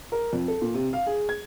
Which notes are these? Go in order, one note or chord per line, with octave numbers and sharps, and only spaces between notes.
A#4
F2
A4
A#2
C3
F5
G#4
G#6